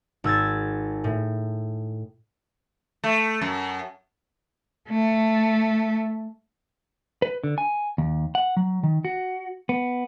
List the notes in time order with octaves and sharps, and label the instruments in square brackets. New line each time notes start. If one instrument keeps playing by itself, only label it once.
[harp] G#1 E6 G#6 A6
A2
[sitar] A3
F#2
[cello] A3
[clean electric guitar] B4
D3
G#5
D#2
F#5
F#3
D#3
F#4
B3